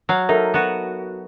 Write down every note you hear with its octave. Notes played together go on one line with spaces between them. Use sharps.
F#3 F5
D#4 A4 A#4 E5
B3 F#4